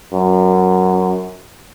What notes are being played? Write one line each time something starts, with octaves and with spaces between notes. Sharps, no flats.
F#2